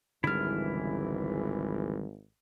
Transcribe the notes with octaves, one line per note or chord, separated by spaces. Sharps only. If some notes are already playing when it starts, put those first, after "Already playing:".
G#1 C#2 D3 E3 G3 E4 F6